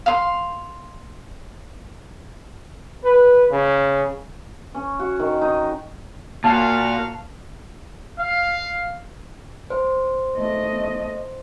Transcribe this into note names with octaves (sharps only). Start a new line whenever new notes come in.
F5 C6
B4
C#3
C#4
F#4
D#3
D#4
A#2 F#4 A#4 F5 A5
F5
C5
A3 D#5